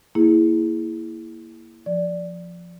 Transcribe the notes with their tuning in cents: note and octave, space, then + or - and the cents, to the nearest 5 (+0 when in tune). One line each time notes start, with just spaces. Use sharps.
A#3 +0 E4 +0 G#4 +0
F3 -5 D5 +0